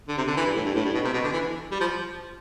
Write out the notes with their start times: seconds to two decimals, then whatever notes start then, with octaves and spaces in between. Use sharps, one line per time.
0.08 D3
0.17 C3
0.28 D3
0.37 E3
0.46 G2
0.56 A2
0.66 G2
0.75 A2
0.85 G2
0.94 B2
1.04 C3
1.14 B2
1.24 D3
1.33 E3
1.72 G3
1.81 F3